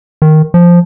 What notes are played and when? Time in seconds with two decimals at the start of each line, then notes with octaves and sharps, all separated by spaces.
0.22 D#3
0.54 F3